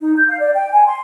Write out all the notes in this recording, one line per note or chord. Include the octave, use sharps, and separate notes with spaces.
D#4
G6
F5
D5
G5
G#5
C6